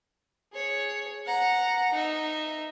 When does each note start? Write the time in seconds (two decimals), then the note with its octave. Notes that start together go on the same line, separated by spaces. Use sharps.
0.53 G#4 C#5
1.25 F#5 A#5
1.93 D#4 E5